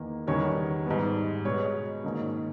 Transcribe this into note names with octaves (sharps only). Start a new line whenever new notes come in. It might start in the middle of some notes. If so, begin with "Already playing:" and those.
Already playing: E2 D#3 A#3
E2 D#3 G3 C#4 C#5
G#2 G3 B3
B2 G#3 B3 C#5
G#2 D#3 A#3 C#4